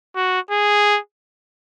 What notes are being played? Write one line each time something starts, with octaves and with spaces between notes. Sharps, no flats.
F#4
G#4